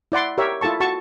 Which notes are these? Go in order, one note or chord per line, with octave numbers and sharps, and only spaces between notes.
E4 D5 F#5 C6
G4 A#4 C#5 E5
E4 F4 A4 A5 C#6
F#4 A5 C#6